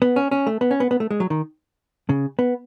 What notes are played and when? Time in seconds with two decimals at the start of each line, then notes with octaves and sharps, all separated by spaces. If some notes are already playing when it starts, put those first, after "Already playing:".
0.02 B3
0.16 C#4
0.31 C#4
0.47 A3
0.61 B3
0.71 C#4
0.80 B3
0.91 B3
1.00 A3
1.11 G#3
1.20 F#3
1.30 D#3
2.09 C#3
2.39 B3